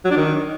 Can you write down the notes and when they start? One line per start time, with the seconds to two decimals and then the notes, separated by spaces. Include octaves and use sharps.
0.05 F#3
0.11 D4
0.17 D#3